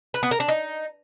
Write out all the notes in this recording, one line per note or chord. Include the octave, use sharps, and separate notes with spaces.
B4
B3
A#4
D4
D#4